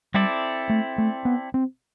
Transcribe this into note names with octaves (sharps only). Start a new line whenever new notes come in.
G3 C4 E4 A4 D5
A3
A3
B3
C4